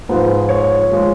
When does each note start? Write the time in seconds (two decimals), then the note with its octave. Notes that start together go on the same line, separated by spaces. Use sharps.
0.09 G#2 F3 G#3 B4
0.49 C#5
0.91 F3 G#3